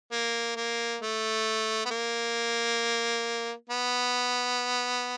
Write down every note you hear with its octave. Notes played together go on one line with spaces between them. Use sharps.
A#3
A#3
A3
B3
A#3
B3